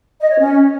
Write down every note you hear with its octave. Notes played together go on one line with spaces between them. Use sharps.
D#5
C#5
C#4